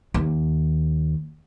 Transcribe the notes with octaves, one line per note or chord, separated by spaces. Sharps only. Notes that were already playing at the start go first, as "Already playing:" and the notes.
D#2